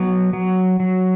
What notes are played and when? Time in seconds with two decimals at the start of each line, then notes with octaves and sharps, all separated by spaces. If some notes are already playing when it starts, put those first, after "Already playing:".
Already playing: F#3 B3
0.33 F#3
0.80 F#3